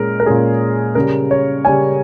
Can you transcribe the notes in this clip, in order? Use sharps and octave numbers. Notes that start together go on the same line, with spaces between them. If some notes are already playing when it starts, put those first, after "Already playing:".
Already playing: A#2 G#3 C#4 A#4
A#4
A#2 G#3 C#4 G#4
C#3 G3 C#4 A#4
C#5
C#3 G3 C#4 G#5